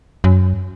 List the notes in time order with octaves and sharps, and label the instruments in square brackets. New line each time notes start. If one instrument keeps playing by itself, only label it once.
[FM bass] F#2